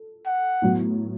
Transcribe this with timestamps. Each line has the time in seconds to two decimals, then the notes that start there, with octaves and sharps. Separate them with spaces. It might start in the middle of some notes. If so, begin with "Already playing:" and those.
Already playing: A4
0.26 F#5
0.62 A2 F#3 B3